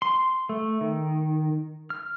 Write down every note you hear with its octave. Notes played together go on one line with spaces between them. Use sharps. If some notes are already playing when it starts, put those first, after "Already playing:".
C6
A3
D#3
F6